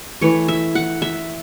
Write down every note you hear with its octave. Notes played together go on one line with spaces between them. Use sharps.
E3 A3 C#5
E5
F#5
E5